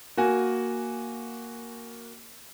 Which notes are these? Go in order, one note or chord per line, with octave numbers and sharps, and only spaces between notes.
A#3 F#4 G#5